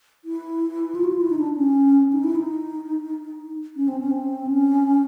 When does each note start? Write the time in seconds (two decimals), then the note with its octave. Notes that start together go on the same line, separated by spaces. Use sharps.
0.25 E4
0.95 F4
1.04 F#4
1.13 F4
1.21 E4
1.30 D#4
1.39 D4
1.57 C#4
2.12 D#4
2.24 E4
2.36 D#4
3.76 C#4
3.88 C4
4.00 C#4
4.11 C4
4.47 C#4